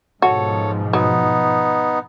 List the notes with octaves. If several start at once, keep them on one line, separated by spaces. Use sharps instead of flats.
G#2 B2 F3 F#4 A4 C#5
F#3 B3 D#4